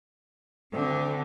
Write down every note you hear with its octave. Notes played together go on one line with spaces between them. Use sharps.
D2 D3 C4